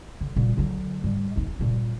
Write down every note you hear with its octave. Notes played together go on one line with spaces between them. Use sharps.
D3
A#2 G3
D3 F#3
G#2 G3
D#2 D#4
G2 A#2